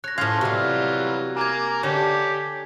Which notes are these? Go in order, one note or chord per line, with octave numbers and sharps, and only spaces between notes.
C#5 F#6 A#6
A2 F3 C#4 F5 C6 C#6 G#6
C3 E3 F#3 G3 F4
A#3 G#5 A#5 D6 G#6
D3 G4 C#5